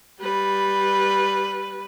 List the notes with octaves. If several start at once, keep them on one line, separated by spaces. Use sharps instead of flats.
G3 B4